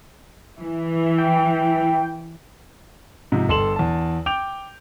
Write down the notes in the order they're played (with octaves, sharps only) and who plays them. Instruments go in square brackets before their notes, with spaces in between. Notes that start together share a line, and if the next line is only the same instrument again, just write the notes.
[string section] E3
[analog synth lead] G5
[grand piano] G#2 C3 F3
G1 A4 C6 E7 F#7
E2 A5
G5 D6 G6 D7 F7